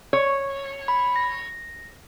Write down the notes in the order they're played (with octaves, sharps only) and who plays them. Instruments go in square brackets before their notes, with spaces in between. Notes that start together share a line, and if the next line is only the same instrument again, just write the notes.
[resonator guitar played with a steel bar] C#5
[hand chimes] B5
A#6